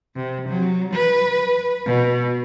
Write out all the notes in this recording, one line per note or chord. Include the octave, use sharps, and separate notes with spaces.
C3
F#3
B4
B2